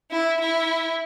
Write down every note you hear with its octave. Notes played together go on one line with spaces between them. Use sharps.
E4
E4